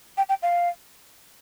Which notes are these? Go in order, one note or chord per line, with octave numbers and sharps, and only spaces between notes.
G5
G5
F5